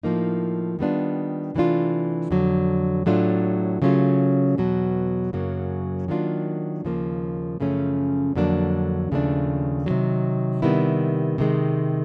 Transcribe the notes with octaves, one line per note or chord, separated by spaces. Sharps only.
A2 F3 A#3 D#4
D#3 G3 B3 D4 F4
C3 E3 A3 D4 F4
F2 D3 F#3
A2 F#3 A3 D4 F4
C#3 F#3 A3 C#4 F4
E2 B2 F#3
F#2 C#3 F#3 A#3
D#3 F#3 A#3 D4 F4
D#2 C#3 F3 A#3
F#2 C#3 F3 A3 C#4
F2 D3 F#3 A#3 D4
D#2 C#3 F3 A3 D4
C3 D#3 F#3
C3 D#3 G3 B3 E4
C3 D#3 G#3